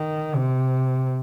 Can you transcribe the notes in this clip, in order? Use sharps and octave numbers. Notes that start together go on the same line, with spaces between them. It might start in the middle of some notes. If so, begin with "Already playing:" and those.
Already playing: D#3
C3